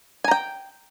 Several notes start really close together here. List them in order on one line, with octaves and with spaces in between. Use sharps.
G#5 A#5 G5